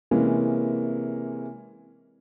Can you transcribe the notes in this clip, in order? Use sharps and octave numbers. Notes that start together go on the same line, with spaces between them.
C3 E3 G#3 A#3 C#4